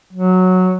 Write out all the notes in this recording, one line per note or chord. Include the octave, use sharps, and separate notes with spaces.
F#3